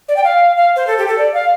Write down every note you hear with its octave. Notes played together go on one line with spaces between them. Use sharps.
D5
G5
F5
F5
C5
A4
G4
A4
D5
F5